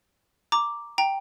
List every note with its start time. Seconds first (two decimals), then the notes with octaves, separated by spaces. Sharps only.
0.52 A#5 D6
0.98 G5 A#5